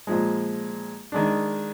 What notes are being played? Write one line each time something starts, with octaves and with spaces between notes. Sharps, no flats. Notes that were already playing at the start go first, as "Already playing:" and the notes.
A#2 F3 G#3
D#3 G#3 D4